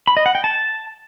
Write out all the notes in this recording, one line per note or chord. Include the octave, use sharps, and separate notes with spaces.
B5
D#5
F#5
G5
A5